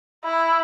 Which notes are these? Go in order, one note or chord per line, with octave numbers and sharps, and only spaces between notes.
E4